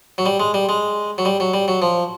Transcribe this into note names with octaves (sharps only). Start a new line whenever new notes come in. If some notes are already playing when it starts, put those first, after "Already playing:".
F#3
G3
G#3
G3
G#3
F#3
G3
F#3
G3
F#3
F3